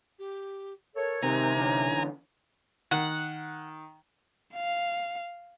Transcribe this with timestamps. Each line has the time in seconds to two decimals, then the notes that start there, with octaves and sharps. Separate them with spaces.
0.19 G4
0.96 A4 A#4 C#5
1.23 C3 D#3 C4 D#4 G#5 A#5
1.57 D3 E3 C#4
2.91 D#3 F#5
4.54 F5